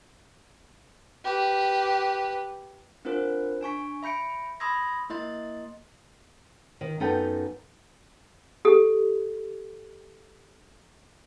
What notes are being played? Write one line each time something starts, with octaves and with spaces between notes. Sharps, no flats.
G4 B4
C4 D4 F4 A#4 C5
D4 G#5 C#6 B6
E5 B5 G6 C#7 D7
B5 C6 D#6 E6 G#6 A#6
A#3 E4 D#5 C6 A6
D#3
F#2 B3 D#4 A4 B4 G5
G4 A4